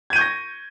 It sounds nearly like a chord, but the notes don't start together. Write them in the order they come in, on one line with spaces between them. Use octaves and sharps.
G#6 D#7 G6 C#6 A#6